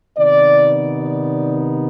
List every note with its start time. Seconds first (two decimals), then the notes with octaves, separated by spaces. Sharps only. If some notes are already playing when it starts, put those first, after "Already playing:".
0.17 C3 D#3 B3 D#4 D5
1.00 D5